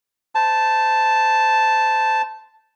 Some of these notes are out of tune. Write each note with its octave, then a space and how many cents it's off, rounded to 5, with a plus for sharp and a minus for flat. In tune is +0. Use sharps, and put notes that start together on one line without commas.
C5 -25 A5 +0